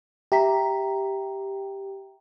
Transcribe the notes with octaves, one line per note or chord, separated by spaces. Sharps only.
G4 E5 A#5 B6